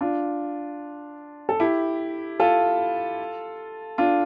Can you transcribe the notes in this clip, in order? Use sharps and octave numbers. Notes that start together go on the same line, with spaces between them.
D4 F4
A4
E4 G4
F4 A4
D4 F4